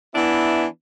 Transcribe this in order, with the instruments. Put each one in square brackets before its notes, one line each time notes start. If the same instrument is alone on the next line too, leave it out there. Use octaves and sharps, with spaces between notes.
[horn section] E3 B3 D4 E4